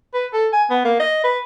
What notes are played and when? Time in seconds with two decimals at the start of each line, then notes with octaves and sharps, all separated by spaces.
0.14 B4
0.33 A4
0.53 G#5
0.70 B3
0.85 A#3
1.00 D#5
1.24 B4